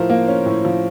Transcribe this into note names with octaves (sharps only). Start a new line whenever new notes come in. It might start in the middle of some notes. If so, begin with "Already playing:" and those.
Already playing: A2 F3 A#4 C5
A#3
C#4
A2
F3